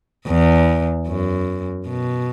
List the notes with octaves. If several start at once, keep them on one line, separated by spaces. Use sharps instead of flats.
E2
F#2
B2